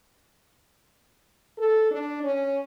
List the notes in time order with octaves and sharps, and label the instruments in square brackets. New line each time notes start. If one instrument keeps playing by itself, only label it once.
[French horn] A4
D4
C#4